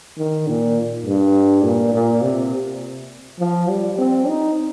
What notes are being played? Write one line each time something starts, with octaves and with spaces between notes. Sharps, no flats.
D#3
A#2
G2
A#2
A#2
C3
F3
G3
C4
D#4